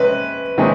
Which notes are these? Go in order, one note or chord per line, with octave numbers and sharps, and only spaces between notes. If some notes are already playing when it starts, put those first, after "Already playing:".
Already playing: C3 G#3 C#4 B4
C3 D#3 G#3 C#4